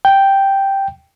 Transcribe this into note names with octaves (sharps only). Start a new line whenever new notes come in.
G5